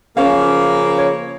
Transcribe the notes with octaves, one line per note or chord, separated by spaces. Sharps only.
C#3 F3 A#3 C#4 C5 F5
C#5